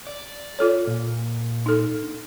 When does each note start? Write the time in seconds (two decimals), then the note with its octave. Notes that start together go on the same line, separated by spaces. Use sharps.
0.07 D5
0.59 F4 A4 C#5
0.87 A#2
1.66 D#4 A4
2.03 D4